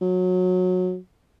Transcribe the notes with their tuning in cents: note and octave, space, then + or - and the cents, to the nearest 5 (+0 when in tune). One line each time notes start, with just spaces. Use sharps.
F#3 -20